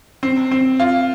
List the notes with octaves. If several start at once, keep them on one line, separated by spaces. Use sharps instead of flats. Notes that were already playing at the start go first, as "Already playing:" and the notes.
C4
C4
F4